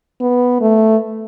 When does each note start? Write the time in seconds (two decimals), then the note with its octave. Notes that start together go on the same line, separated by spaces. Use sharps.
0.21 B3
0.61 A3